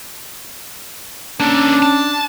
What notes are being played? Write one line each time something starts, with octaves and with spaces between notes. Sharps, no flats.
A#3 C#4 D4 A4
A5